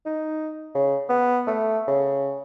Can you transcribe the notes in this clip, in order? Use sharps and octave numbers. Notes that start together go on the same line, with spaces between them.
D#4
C#3
B3
A3
C#3